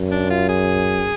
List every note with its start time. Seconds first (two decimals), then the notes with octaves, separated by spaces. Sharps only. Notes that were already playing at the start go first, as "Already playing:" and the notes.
Already playing: F#2
0.11 D4
0.30 F4
0.49 G#4